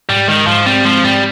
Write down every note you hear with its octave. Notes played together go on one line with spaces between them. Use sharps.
G#2 G3
D#3 G#3
G#2 F3
G3 C4
F3 G#3
G#2 G3